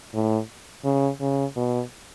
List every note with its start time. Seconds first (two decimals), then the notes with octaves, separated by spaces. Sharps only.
0.14 A2
0.85 C#3
1.20 C#3
1.56 B2